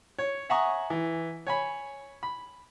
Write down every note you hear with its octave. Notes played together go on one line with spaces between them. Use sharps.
C#5
E5 F#5 G#5 A#5 C#6 D#6
E3
C#5 G#5 B5
B5